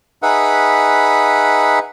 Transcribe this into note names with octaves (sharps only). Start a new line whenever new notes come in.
D#4 G#4 B4 E5 F#5 B5